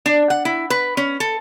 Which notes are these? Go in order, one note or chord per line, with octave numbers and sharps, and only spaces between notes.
D4
F#5
E4
B4
C#4
A4